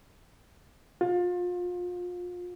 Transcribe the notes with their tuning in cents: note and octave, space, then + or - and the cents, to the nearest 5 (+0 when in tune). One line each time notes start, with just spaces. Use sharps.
F4 +30